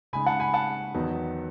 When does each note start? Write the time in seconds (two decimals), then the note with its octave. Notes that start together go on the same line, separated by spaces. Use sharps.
0.13 C#3 G#3 D#4 G#5 B5
0.27 F#5 A5
0.40 G#5 B5
0.54 F#5 A5
0.94 E2 D#3 F#3 B3 D#4